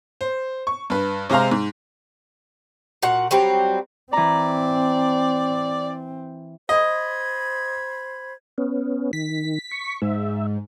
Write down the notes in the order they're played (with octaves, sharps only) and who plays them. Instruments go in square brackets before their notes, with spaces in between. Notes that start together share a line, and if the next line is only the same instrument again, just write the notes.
[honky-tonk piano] C5
C#6
G2 B4
C3 G#3 C5 F5 A#5
G#2
[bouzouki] A#2 F#4 F#5
F#3 G3 C4
[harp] E3 A#5 [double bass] C4 [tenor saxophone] D5
[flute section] C5 B5 G#6 [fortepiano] D#5
[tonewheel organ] B3 C#4
[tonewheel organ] D#3 [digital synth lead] B6
[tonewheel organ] C#6
[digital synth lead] G#2 [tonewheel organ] E5